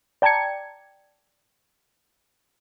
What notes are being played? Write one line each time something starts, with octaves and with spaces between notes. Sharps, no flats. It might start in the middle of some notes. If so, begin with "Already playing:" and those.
D5 G5 A5 A#5 G#6 C#7